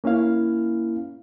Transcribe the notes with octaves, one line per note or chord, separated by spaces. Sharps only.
A#3 C#4 E4 F5